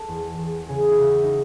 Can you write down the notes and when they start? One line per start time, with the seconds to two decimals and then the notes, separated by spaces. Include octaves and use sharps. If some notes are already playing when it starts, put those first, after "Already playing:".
Already playing: A4
0.08 E2
0.38 E2
0.68 C#3 G#4
0.90 E4
0.99 C#3 F#4
1.24 D#4